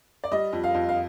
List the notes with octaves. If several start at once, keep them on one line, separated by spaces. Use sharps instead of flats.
D5
G3 D#5
F2
F5
F2
F5